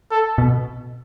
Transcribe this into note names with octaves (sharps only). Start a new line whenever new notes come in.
A4
B2